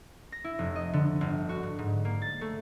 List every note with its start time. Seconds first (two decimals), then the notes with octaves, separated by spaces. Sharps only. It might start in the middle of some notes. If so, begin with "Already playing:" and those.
0.32 A#6
0.44 E4
0.59 F1
0.76 D#5
0.93 D3
1.21 G1
1.49 F#4
1.63 G2
1.79 G#2
2.05 A#3
2.22 A6
2.41 A3